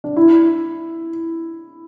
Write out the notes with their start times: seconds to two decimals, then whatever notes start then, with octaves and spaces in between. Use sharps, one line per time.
0.04 D4
0.16 E4